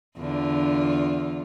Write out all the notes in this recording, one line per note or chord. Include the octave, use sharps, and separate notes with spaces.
E2 D3 F4